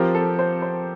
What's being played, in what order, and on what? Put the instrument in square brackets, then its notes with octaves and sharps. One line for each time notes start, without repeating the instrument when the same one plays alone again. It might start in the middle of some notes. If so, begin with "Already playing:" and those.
Already playing: [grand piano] F3 C4 F4 A#4 [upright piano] G4
[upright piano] A4
C5
C5